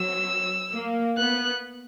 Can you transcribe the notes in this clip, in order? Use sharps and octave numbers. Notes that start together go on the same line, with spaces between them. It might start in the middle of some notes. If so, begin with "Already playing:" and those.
Already playing: F#3 E6
A#3
B3 F#6